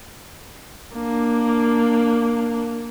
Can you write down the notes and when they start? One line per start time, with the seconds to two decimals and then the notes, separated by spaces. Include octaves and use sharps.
0.94 A#3 D4